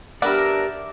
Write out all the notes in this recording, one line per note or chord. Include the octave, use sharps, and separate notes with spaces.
G3 B3 D4 G4 A#4 D5 E5